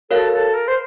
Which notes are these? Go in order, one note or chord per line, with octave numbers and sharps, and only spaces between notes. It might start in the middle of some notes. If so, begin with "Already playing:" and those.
F#4 A4 A#4 C#5 F5
A4
A#4
C5